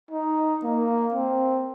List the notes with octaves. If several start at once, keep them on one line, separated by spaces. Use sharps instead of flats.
D#4
A#3
C4